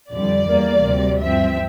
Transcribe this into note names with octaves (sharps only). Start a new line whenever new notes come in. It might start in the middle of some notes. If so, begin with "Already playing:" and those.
F2 D3 G3 D5
E2 E3 G3 A#3
D2 C3 G3
G2 F3 C4 E5